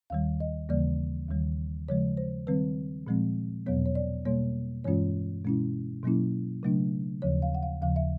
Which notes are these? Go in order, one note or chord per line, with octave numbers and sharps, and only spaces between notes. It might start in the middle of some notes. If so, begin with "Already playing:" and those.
D#2 D#3 G3 F5
D#5
D#2 C#3 E3 G3 A#3 D5
D#2 D#3 G3
C#3 F3 G#3 C#5
C5
D#3 G3 C4 B4
A#2 F3 G#3 C4
E2 B2 F#3 B3 C#5
C#5
D5
B2 G3 A#3 C#5
G2 E3 G#3 C#4 F4 C#5
B2 G#3 C#4 E4
B2 F#3 A#3 C#4 E4
C#3 F#3 A3 D4
D#2 C#3 F3 C#5
F5
F#5
F5
D#2 C#3 F3 F5
E5